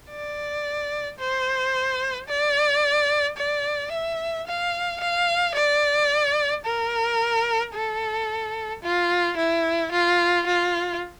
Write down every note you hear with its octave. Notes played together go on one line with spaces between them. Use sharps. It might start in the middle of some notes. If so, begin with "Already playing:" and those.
D5
C5
D5
D5
E5
F5
F5
D5
A#4
A4
F4
E4
F4
F4